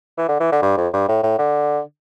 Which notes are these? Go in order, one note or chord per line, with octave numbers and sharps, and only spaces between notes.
E3
D3
E3
D3
G2
F2
G2
A2
A2
D3